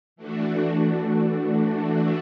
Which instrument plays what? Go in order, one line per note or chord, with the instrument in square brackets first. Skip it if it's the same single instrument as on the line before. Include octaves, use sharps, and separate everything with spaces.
[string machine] E3 A3 D4 F#4